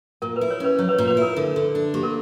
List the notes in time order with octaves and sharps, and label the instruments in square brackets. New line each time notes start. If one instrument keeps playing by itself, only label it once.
[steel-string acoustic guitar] A#2 [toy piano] A#4
[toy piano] B4
[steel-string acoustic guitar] E4
[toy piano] C#5
[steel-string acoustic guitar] C#4 [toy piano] B4
[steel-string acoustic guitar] F#3 [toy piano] C#5
[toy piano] B4
C#5
[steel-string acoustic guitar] A#2
[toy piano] B4
[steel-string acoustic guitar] E4 [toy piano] A#4
[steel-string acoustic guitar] D3
D3
D4
[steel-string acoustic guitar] A#3 [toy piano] G4
[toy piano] A#4